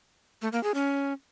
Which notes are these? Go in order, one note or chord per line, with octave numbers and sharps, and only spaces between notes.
A3
A#3
G#4
C#4